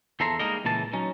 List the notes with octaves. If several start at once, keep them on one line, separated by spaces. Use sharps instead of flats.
E2 F3 A4 E5 A#5 C6
G3 G#3 A#3 D#4 A#4 D#5
C#2 A#2 E3 A5
F#3 C#4 D#4